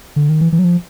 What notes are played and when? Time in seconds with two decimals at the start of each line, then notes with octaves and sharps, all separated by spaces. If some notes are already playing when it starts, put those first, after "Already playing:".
0.16 D3
0.29 D#3
0.41 E3
0.52 E3
0.59 F#3
0.64 F3